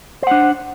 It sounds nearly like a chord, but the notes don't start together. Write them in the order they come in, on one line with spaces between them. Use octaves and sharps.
C5 F#5 D4